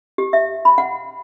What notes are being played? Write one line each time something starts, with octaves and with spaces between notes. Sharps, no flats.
G4
E5
B5
F#5